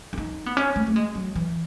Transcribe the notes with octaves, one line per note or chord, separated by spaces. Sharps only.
C#4
D#4
B3
C#4
A3
A3
G#3
F#3
E3